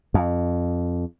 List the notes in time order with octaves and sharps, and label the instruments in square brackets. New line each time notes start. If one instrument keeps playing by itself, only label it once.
[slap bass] F2